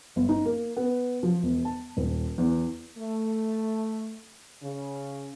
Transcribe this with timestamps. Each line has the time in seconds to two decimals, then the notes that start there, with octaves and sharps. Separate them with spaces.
0.16 G1
0.29 D#4
0.45 A#3
0.77 B3
1.23 F3
1.43 E1
1.65 A5
1.97 D#1
2.38 E2
2.98 A3
4.62 C#3